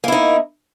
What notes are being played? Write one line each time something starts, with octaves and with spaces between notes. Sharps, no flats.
A#3 D#4 E4